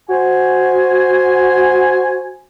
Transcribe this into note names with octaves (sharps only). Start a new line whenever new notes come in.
F#4 C5 G#5